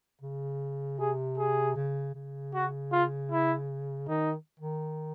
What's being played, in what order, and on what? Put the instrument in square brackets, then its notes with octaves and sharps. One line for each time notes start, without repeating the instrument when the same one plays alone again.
[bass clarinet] C#3
[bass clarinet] C3 [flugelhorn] G#4
[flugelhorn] G#4
[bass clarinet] C#3
C#3
[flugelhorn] F#4
F4
E4
[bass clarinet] D#3 [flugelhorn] D#4
[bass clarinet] D#3